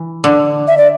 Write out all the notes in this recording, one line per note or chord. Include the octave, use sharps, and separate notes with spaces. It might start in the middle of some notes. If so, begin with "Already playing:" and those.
Already playing: E3
D3
E5
D5